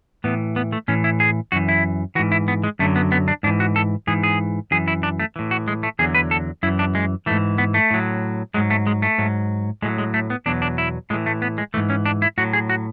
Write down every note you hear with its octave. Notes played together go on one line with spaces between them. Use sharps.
A2 E3 B3
B3
A3
A2 E3 C#4
E4
G#4
F#2 E3 F#4
E4
G#2 E3 F#4
E4
B3
G#3
F#2 D3 F#3 A3
B3
B3
D4
G#2 E3 D4
F#4
A4
G#2 E3 G#4
G#4
F#2 E3 G#4
E4
D4
A3
A2 E3
F#4
G#3
A3
E2 D3 F#3 G#4
B4
A4
F#2 E3 E4
D4
G#3
G#2 E3 A3
B3
A3
A2 F#3
G#2 F#3 G#3
A3
G#3
A3
G#2 F#3
A2 F#3 G#3
G#3
A3
B3
E2 B2 F#3 D4
D4
E4
A2 E3 G#3
A3
B3
G#3
G#2 E3 A3
C#4
D4
E4
A2 F#3 F#4
G#4
F#4